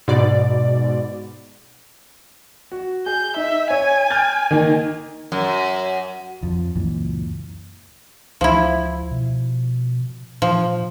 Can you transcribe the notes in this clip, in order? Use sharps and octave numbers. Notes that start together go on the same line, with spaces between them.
G#2 B2 D5
F#4
G#4 G6
D#4 E5
C#5 G#5
F6 G6 A6
D#3 A#3 D#4
F#2
F2 F3
C#2 F#2 A#2 E3
C#2 F3 E4
B2
A#2 F3